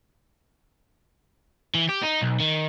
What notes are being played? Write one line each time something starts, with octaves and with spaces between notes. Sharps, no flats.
E3
G4
D#4
B1
D#3